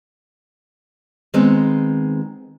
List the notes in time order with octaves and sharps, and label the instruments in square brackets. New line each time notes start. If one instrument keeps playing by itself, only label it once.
[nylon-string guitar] D#3 G#3 B3 C4